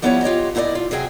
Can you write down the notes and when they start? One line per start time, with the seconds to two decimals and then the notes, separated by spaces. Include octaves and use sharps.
0.02 F3 G3 B3 C#4 E4 C#5
0.22 F4 G4 C#5 D#5
0.55 A#2 E4 F#4 C5 D5 D#5
0.75 F4
0.91 C3 F#3 G#4 G5 G#5